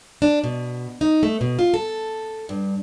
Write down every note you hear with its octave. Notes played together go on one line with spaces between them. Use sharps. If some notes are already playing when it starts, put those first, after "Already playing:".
D4
B2
D#4
A3
B2
F4
A4
G2